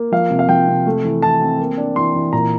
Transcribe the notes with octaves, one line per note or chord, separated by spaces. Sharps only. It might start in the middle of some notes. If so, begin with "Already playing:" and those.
Already playing: A#3
F3 F5
C3
F5
F3 G5
C3
A3
E3
E3 A5
C4
A#3
D4
E3 C6
E3
A#2 A#5